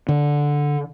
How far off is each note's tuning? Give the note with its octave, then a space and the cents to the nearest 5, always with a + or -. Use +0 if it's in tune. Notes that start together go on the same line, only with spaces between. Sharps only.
D3 -5